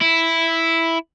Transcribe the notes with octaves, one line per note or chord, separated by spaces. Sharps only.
E4